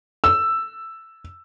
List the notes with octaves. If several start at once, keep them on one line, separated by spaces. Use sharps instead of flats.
E6